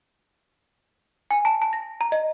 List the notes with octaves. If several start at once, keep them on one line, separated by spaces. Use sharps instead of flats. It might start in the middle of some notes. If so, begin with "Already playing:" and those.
G#5
A5
A5
A#6
A#5
D#5